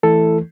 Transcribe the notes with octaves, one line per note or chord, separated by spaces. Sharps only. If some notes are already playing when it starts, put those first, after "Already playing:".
E3 A3 E4 A4